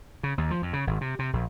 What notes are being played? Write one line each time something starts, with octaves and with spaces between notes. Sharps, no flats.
C#3
D#2
F3
F2
C#3
G#1
C3
C3
A#1